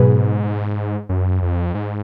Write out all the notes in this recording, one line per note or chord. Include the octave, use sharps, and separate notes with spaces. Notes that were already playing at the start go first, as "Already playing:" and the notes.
Already playing: G#2 B2 F#3 G#4 B4
F#2
F2
G#2